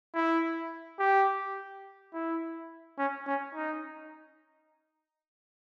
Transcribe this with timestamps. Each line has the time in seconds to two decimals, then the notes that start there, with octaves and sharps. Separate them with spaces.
0.14 E4
1.00 G4
2.13 E4
2.98 C#4
3.27 C#4
3.55 D#4